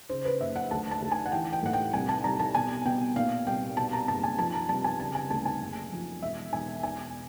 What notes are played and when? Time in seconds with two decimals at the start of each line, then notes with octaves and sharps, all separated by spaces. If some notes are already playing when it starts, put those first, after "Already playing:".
0.09 C#3 C5
0.25 B4
0.40 F#1 E5
0.56 F#5
0.71 D2 A5
0.91 A5
1.02 D2
1.12 G#5
1.26 F#5
1.32 E3 G5
1.53 G5
1.62 A2 F#5
1.73 G5
1.93 C2 G#5
2.09 A5
2.24 C2 A#5
2.39 A5
2.55 B2 G#5
2.85 B2 G5
3.16 A#2 F5
3.47 C2 G5
3.77 B2 A5
3.93 A#5
4.08 F#1 A5
4.23 G#5
4.38 F3 A5
4.54 A#5
4.69 C2 A5
4.84 G#5
5.00 C#3 A5
5.15 G#5
5.30 D2 A5
5.45 G#5
5.61 F#1
5.92 F3
6.22 E1 E5
6.53 E1 G#5
6.83 B2 G#5